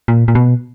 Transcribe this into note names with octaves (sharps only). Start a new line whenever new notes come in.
A#2
A#2
B2